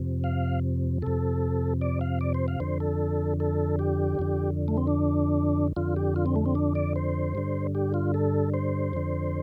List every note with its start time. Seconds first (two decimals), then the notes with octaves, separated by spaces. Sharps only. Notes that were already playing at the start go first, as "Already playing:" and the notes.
Already playing: F2 C3
0.24 F5
1.02 F2 C3 A4
1.81 D5
2.01 F5
2.21 D5
2.34 C5
2.48 F5
2.60 F2 D3 C5
2.80 A4
3.40 A4
3.79 G4
4.19 F2 D3
4.68 A3
4.78 C4
4.87 D4
5.76 F2 D3 F4
5.96 G4
6.16 F4
6.26 C4
6.36 A3
6.46 C4
6.55 D4
6.75 D5
6.96 C5
7.35 G2 D3
7.75 G4
7.94 F4
8.14 A4
8.54 C5
8.93 F2 D3